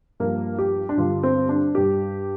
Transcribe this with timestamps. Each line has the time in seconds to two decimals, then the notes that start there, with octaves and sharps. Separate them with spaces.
0.20 G2 F3 A#3
0.59 G4
0.89 D4
0.97 G2 D3 G3 F4
1.23 C4
1.49 D4
1.75 G2 G3 G4